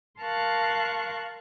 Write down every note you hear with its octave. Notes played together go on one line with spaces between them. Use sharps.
A#4 F5 A5 C6 C#6 F#6